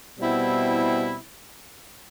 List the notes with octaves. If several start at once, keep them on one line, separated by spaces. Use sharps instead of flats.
B2 G3 C4 E4